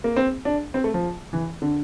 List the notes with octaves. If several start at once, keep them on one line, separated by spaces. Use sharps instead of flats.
A#3
C4
D4
C4
A3
F3
E3
D3